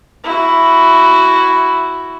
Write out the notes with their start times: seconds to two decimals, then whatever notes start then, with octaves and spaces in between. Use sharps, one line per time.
0.24 E4 F#4